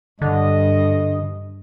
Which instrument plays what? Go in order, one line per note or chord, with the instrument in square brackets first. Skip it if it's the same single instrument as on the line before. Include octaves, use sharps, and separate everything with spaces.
[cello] G2 [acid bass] D3 [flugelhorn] D#5